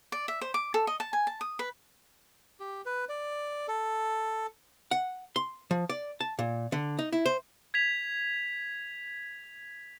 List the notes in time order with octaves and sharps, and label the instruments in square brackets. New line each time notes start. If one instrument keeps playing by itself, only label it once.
[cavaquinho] D5
E5
C5
D6
A4
D#5
A5
G#5
A5
D#6
B4
[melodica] G4
B4
D5
A4
[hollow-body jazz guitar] F#5
C6
F3
D5
A5
A#2
D3
D#4
E4
C5
[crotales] G#6 B6 F7